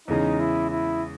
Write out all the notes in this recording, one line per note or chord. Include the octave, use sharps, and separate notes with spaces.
E2 C#3 G#3 C#4 D#4
E4
E4